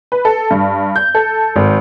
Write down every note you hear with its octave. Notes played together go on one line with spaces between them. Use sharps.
B4
A4
G2
G6
A4
G#1